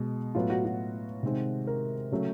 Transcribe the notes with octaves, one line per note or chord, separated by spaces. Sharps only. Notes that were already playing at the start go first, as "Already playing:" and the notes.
Already playing: B2 G#3
A2 F#3 B3 F4
F#4
F#4
C3 D#3 G#3 C4
A#4
C#3 F#3 A3